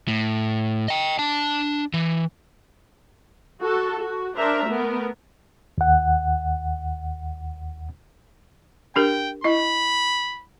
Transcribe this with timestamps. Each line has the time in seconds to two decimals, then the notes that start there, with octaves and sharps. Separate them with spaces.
0.08 A2
0.88 D#5 G5
1.19 D4 A5
1.94 E3
3.62 F#4 A4
4.02 F#4
4.36 D4 A#4 C5 E5 A#5
4.69 A3 B3 A#4
5.78 D#2 F#5
8.96 D4 G4 A#4 G5
9.44 E4 D#5 B5